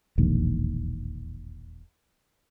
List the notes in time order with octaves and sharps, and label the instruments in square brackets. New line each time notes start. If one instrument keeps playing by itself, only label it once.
[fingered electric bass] E1 A#1 D#2